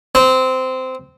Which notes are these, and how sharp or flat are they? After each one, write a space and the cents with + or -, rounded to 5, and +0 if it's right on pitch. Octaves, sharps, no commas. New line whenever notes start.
C4 -15